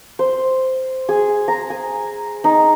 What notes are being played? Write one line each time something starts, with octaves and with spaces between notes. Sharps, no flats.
C5
G#4
A#5
G#5
D#4